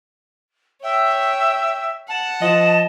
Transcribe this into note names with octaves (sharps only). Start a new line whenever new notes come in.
C#5 E5 G5
F#5 A5
F3 D#5